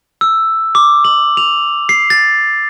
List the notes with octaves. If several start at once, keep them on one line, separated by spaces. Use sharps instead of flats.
E6
D6
F#7
F7
C7
A6